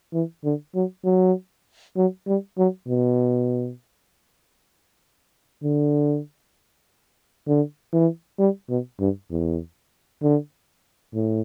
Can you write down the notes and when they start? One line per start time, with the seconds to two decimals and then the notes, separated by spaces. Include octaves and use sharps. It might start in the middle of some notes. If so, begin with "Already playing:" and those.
0.13 E3
0.44 D3
0.74 F#3
1.05 F#3
1.96 F#3
2.27 G3
2.58 F#3
2.88 B2
5.63 D3
7.47 D3
7.93 E3
8.39 G3
8.69 B2
9.00 G2
9.31 E2
10.22 D3
11.13 A2